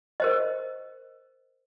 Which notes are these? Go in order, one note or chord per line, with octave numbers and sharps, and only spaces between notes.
A#4 C5 D#5